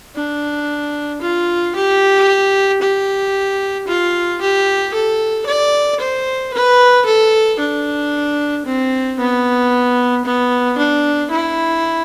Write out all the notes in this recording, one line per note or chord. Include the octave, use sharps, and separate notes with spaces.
D4
F4
G4
G4
F4
G4
A4
D5
C5
B4
A4
D4
C4
B3
B3
D4
E4